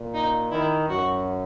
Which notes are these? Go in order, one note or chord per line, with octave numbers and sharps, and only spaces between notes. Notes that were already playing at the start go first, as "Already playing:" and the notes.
Already playing: A#2
D#4
D#3 E4
F#2 F#4